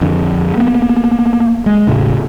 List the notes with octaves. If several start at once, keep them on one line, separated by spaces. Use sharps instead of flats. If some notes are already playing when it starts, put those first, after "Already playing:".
F2 D3
A#3 B3
G#3
E1 B1 A2 C#3